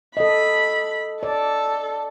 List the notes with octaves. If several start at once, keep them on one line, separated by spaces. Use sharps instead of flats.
A4 D#5 B5
A4 D5